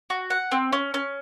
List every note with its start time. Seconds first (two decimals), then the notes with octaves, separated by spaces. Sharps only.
0.10 F#4
0.30 F#5
0.52 C4
0.73 C#4
0.94 C#4